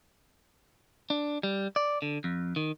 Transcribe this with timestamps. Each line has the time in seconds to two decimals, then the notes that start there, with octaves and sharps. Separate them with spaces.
1.10 D4
1.43 G3
1.76 D5
2.02 D3
2.24 F2
2.56 D#3